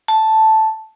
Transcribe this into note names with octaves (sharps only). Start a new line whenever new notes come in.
A5